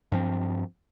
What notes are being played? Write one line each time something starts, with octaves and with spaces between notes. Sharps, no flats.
G2 F3 C4